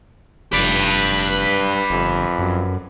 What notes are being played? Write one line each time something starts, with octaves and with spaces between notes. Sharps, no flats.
F1 G2 B4 D5
G1 F2
F#2